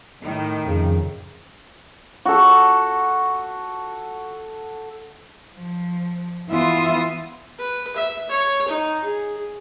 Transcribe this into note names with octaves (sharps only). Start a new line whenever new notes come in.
A2 D#3
F2 C#3
F#4 A4
F3
E3 B3 F4 E5 C6 D#6
B4
E5
C#5
D#4
G#4